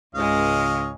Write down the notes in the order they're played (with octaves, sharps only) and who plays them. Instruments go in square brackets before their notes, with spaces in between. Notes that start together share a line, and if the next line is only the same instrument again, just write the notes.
[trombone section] C#2 [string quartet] G#2 G#3 [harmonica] C#5 D#5 F5